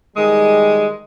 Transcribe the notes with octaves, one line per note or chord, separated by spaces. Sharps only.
D#3 G3 G#3 D#6